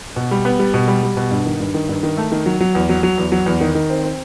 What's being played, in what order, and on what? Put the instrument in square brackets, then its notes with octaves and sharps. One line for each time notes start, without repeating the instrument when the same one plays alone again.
[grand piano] B2
G3
B3
G3
B2
G3
G3
B2
G2
D#3
G2
D#3
G2
D#3
A3
D#3
F#3
F#3
E2
F#3
F#3
E2
F#3
E2
D#3
D#3
C4
C4